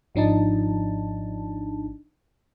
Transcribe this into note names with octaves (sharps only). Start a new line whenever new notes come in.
G#1 F3 D4 D#4 A5